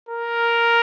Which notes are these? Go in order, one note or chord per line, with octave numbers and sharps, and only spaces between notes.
A#4